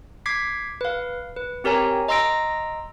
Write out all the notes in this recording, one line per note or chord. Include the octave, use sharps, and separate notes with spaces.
D6 G#6 B6 C7
B4 F5
B4
C4 G4 A#4 C#5 G#5 A#5
D#5 A#5 C6 E6 A#6 D7